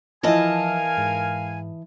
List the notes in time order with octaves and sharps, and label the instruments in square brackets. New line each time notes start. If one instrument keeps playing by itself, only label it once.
[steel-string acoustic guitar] E3 D#5 A5 [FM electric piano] F3 E4 [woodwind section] A#4 F5 G#5
[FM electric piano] G#2